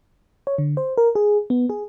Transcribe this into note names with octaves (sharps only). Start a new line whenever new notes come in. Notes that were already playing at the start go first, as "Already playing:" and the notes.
C#5
D3
C5
A#4
G#4
B3
G#4